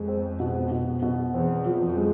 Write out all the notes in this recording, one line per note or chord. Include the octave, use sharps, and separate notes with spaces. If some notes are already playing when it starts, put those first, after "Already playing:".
Already playing: F2 G#3
C4
B2
B2
B2
E2 C4
F3
F2
G#3